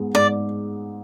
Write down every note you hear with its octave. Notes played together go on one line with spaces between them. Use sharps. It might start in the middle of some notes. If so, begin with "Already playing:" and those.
Already playing: G#2 G#3 B3
G#2 D5